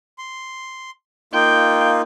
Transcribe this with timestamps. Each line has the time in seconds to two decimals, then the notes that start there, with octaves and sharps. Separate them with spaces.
0.18 C6
1.33 A#3 D#4 F4 G5